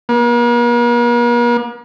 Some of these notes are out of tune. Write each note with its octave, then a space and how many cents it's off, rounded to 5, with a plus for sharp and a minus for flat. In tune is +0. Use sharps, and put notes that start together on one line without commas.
A#3 +45